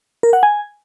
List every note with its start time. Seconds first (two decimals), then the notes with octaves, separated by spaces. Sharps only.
0.23 A#4
0.33 F#5
0.43 G#5